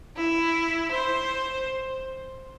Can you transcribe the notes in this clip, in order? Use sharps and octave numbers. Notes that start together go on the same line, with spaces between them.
E4
C5